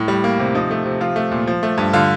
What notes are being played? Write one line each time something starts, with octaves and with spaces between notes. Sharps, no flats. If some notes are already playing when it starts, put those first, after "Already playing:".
Already playing: A2
G3
A#3
C3
F3 D#4
A3
C3
F3 F4
A3
A#2
F3
A3
G2
D3 F4